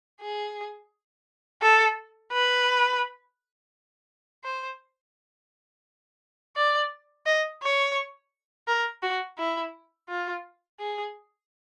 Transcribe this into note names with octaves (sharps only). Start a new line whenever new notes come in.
G#4
A4
B4
C5
D5
D#5
C#5
A#4
F#4
E4
F4
G#4